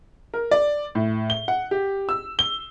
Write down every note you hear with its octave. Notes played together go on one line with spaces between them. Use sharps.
A#4
D5
A2
G7
F#5
G4
E6
G7